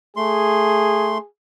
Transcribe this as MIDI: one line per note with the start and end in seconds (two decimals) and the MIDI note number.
0.17 1.18 57
0.17 1.27 68
0.17 1.18 84